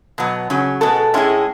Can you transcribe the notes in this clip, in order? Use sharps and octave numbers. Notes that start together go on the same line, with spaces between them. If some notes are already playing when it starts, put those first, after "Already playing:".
B2 F#3 B3
C#3 F#3 C#4
B2 G#3 B3 F#4 A4
A2 G#3 C#4 E4 G#4